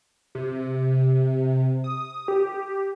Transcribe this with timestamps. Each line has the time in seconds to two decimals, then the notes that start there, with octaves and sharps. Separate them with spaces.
0.35 C3
1.84 D#6
2.28 G4